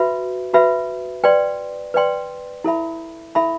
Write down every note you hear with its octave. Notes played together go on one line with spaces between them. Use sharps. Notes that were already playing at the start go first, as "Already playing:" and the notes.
Already playing: F#4 B4 E5 B5
F#4 B4 E5 B5
B4 D5 G5 C6
B4 D5 G5 C6
E4 A4 E5 B5
E4 A4 E5 B5